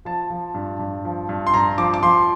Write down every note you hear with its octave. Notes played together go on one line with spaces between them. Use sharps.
F3 A5
F3
G2
G2
F3
G2
C6
G2 A#5
F3 D6
D6
F3 C6